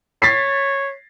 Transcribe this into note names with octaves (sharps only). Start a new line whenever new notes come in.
C#5 A6 B6 C7